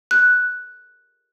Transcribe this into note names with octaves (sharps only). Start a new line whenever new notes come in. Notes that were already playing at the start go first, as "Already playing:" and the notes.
F#6